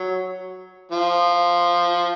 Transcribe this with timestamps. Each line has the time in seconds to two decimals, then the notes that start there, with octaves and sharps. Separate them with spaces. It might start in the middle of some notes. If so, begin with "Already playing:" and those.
Already playing: F#3
0.92 F3